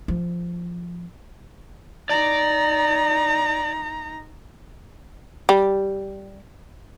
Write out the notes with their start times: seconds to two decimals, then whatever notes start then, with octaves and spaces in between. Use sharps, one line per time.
0.08 F3
2.09 D#4 D5 A#5
5.49 G3